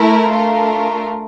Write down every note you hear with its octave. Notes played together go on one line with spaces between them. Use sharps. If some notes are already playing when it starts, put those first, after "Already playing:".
Already playing: A3 E4 A#4
A3 D4 F4 A#4